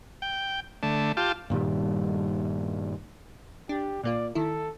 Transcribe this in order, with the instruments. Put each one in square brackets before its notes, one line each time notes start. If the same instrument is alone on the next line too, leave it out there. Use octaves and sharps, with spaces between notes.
[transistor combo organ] G5
D3 A3
F4 G4 A5
[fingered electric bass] G2 A#2 D#3 G3
[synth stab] D4 [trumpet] G4
[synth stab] A#2 A#3 F4 [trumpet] D5
[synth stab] D#3 E4 [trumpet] A4